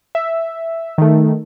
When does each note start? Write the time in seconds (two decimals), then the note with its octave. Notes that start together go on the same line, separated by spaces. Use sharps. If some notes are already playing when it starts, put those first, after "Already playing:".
0.15 E5
0.98 D#3 A3